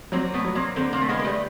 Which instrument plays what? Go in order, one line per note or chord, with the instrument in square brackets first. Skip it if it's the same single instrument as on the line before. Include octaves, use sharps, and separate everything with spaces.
[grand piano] F#3 [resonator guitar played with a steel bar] A#3 C4
[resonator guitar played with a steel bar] A3 B3
[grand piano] F#3
[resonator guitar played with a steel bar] A#3 C4
[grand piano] D3 [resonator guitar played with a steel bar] A#3 C4
[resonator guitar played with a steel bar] A#3 C4
A3
[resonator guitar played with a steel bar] G#3 A#3 [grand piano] B3
[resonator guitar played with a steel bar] A#3
G3 A3